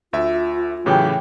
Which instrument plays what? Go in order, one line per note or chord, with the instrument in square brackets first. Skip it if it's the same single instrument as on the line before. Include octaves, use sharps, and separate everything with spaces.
[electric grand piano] D2 E5 [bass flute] F4
[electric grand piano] A2 C#3 E3 [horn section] F#3 G4